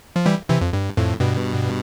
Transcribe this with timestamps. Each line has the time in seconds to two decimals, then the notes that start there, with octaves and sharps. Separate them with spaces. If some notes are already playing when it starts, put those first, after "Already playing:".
0.16 F3
0.26 E3 G3
0.49 C3 E3
0.61 F2
0.73 G2
0.97 F2 A2
1.20 G2 B2